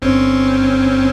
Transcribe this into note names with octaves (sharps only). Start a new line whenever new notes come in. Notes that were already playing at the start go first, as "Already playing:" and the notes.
G1 C4 C#4